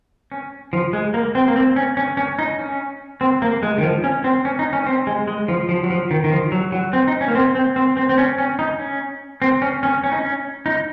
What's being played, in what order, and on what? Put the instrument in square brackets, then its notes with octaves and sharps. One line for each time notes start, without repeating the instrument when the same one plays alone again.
[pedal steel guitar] C#4
F3
G#3
A#3
C4
A#3
C4
C#4
C#4
C#4
D#4
C#4
C4
A#3
G#3
D#3
F3
C#4
C4
C#4
D#4
C#4
C4
G#3
G#3
F3
F3
F#3
F3
D#3
D#3
F3
F#3
F#3
C4
D#4
C#4
A#3
C4
C4
C4
C4
C4
C#4
C#4
D#4
C#4
C4
C#4
C#4
C#4
D#4
C#4
D#4